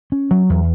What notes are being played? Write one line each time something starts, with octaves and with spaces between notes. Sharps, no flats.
C#4
F#3
E2